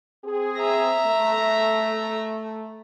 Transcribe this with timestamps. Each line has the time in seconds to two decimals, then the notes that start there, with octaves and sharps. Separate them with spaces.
0.25 C4 G#4
0.58 E5 A#5
1.06 A3